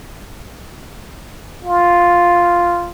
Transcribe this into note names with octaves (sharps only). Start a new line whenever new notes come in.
F4